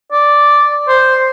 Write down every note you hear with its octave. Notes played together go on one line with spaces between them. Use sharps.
D5
C5